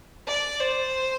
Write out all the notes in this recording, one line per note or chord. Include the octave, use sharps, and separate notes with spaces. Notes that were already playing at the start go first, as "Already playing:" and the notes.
D5
C5